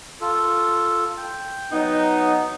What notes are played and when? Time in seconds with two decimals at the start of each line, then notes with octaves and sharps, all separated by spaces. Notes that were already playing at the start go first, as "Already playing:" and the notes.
0.21 F4 A4
1.17 G5
1.72 F#3 B3 D#4